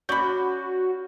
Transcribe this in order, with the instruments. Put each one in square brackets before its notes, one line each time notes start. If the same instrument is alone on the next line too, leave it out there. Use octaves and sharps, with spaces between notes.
[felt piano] C#4 C#6 G6 [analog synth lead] F#4 [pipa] D5 B5